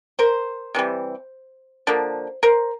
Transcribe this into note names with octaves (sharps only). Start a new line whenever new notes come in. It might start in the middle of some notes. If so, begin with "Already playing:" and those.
A#4 C5
C3 E3 G3
D3 F3 A#3
A#4 C5